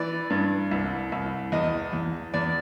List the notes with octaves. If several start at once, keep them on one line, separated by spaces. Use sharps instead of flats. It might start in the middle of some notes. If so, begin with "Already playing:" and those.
Already playing: E3 D5
G2
C2
C2
E2 D#5
E2
E2 D5